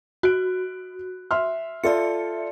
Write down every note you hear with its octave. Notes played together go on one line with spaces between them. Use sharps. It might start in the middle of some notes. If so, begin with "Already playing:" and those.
F#4 F#6 D7
E5 C6 F6
F4 A4 D5 E5 C#7